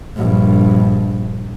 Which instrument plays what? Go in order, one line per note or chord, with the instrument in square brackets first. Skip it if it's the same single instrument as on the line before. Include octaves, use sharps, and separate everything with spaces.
[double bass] A#1 G2